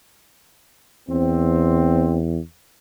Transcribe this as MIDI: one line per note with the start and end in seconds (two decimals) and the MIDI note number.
1.09 2.39 40
1.09 2.16 60